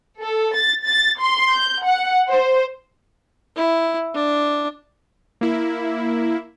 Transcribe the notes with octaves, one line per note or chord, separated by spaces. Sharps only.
A4
A6
A6
C6
G6
F#5
C5
E4
D4
A#3 E4